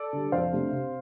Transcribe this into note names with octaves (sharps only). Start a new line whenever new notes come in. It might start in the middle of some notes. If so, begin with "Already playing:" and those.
Already playing: A4 D5
D3 G3
F2 C5 F5
C3 A3 D4
C3